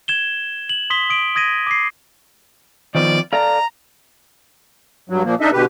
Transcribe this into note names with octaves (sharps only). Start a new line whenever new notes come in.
G#6 E7 G7
F#7
C6 D#6 B6 G7
D#6 D7 F#7
D#6 G#6 A#6 D#7
D6 C7
D#3 F3 B3 D5
A4 D5 F5 A#5
G2 F#3
A#2 F3 A#3
D4 D#4 A4 D#5 E5
B2 D3 G4 B4